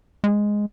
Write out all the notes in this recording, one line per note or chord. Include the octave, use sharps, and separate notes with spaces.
G#3